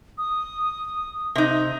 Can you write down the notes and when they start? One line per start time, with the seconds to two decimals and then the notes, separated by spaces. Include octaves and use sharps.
0.18 D#6
1.35 C3 D#4